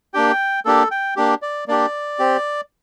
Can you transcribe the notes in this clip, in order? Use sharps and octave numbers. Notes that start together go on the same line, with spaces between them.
A#3 D4 G4 G5
A#3 D4 G4 A4
G5
A#3 D4 G4
D5
A#3 D4 G4 D5
C4 G4